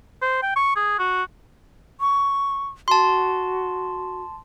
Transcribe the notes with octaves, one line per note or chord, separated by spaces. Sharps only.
C5
G5
C#6
G#4
F#4
C#6
F#4 A5 C6